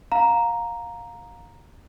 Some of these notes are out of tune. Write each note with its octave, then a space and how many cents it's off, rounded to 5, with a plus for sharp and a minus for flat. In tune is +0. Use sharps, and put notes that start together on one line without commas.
F5 +25 A#5 +0